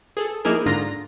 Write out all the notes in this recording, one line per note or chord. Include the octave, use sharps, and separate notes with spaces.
G#4 A4
F3 A#3 D#4 E4 G#4 A#4
G#2 D3 F4 A#5 A#6